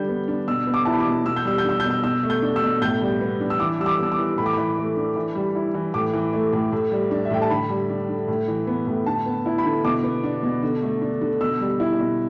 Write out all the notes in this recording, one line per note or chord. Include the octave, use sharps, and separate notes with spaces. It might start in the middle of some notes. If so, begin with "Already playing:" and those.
Already playing: D3 G3 G6
B3
D4
B2 E6
B3
D6
E4 A5
B5
D6
B2
B2 E6
G6
G3 E6
G6
D4 E6
B2 G6
E6
B2 E6
A3
G6
D4
E6
B2
A2 G6
G3
B3
D4
E6
E3 D6
G3 E6
D6
B3 E6
D6
E3
A2 B5
D6
E3 B5
A3
D4
E3
G3
E4
E3
A2 D6
E3
A3
A2
A2
G3
D4
E5
A2 G5
A5
D3 B5
G3
D4
D3
A2
E3
B3
A2
D3 A5
B3
E4
B5
D3
B2 D6
B3
D4
B2
D3
A3
D4
D3
B2 E6
G3
E4
B2